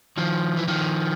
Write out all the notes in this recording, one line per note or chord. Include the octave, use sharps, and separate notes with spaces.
D#3 F3
E3
D#3 F3